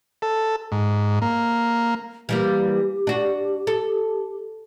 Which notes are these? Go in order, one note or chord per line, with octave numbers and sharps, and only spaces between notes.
A4
G#2
A#3
E3 G3 A#3 G4
D4 F#4
A4